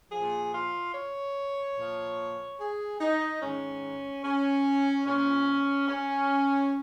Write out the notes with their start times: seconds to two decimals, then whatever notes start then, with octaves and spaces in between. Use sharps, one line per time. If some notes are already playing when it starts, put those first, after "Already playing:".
0.11 A#2 F3 G#4
0.53 F4
0.94 C#5
1.77 A#2 F3
2.59 G#4
3.00 D#4
3.41 G#2 D#3 C#4
4.24 C#4
5.06 A#2 F3 C#4
5.88 C#4